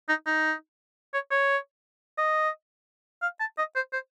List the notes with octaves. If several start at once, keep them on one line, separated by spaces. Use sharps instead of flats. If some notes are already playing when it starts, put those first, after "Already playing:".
D#4
D#4
C#5
C#5
D#5
F5
A5
D#5
C5
C5